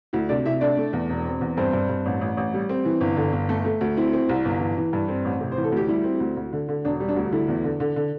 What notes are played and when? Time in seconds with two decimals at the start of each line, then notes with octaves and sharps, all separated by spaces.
0.13 D2 E4
0.29 C3 D4 D5
0.45 C3 E4 E5
0.61 A3 D4 D5
0.77 A3
0.93 E2
1.09 E1
1.25 C4
1.41 E2
1.57 G2 C4 C5
1.73 G2
1.89 G2
2.06 A1
2.21 A1
2.37 A1
2.54 G3
2.69 C4
2.85 E3
3.01 G1
3.16 D3
3.33 G1
3.49 A3 A4
3.65 A3
3.81 D2
3.97 C4 E4
4.13 C4
4.29 C2
4.45 G1
4.60 E3
4.77 E3
4.93 G2
5.08 C4
5.25 A1
5.41 C3
5.52 C5
5.57 E3
5.64 A4
5.72 D2 G4
5.88 G3 E4
6.04 C4
6.20 D2
6.37 D2
6.53 D3
6.69 D3
6.85 E1 D4
7.00 G3
7.09 D4
7.16 D2
7.32 D3 E4
7.48 E2
7.64 D3
7.80 D3
7.96 D3